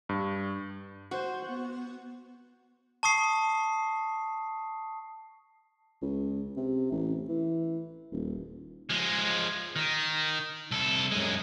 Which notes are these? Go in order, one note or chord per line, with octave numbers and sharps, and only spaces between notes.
G2
F#4 C5
B3
A5 C#6 D#6 C7
C#2
C3
A1
E3
D#1
F3 G#3
D#3
C2 A4
F#2 G#3